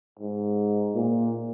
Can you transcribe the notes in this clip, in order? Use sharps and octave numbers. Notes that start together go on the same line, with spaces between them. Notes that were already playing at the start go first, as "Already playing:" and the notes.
G#2
A#2